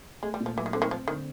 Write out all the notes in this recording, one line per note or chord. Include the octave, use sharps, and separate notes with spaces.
G#3 A3
G3
A#2
F3
E3 F#3
D#3
D3 C4
D#3
F3 C4
D3 D#3